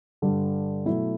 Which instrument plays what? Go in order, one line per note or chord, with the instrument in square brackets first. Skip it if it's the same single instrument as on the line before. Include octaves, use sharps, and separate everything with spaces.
[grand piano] G2 D3 G3
B2 F#3 A3 E4